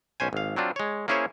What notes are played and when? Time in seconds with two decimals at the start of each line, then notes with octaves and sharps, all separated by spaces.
0.20 B1 C#4 C5 G#5
0.33 G#1 F5
0.56 F#3 C4 D4 F4
0.76 G#3 C#5
1.08 A#3 C#4 E4 G#4 C5 C#5